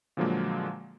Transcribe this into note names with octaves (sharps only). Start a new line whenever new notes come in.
A#2 D3 F3 F#3 G#3 A#3